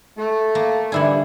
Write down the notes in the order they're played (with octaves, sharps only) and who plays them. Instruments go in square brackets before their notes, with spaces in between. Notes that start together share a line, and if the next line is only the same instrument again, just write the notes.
[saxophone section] A3
[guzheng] A#3
[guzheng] D3 E4 G#4 [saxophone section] E3 G3